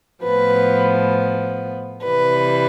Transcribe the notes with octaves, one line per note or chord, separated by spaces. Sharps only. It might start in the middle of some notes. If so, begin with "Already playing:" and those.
A2 F3 B3 B4
C3 E3 G3 B4